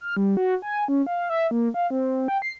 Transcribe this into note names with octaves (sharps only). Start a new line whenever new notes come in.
F6
G3
F#4
G#5
C#4
F5
E5
A#3
F5
C4
G5
C7